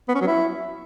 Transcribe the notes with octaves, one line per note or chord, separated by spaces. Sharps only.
B3
C#4
F#3
E4